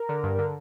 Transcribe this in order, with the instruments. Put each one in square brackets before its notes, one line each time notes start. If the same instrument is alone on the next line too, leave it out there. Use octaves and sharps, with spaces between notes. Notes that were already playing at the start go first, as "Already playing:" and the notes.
Already playing: [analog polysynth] A#4
D3
G2
D3